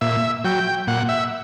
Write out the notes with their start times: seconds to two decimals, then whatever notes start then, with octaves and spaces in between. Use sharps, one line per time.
0.01 A#2 E5
0.44 F#3 G5
0.87 A#2 F#5
1.09 E5